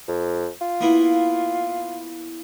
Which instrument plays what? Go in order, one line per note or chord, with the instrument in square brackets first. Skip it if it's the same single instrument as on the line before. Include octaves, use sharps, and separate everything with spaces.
[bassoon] F2
F4
[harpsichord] A#3 B3 E4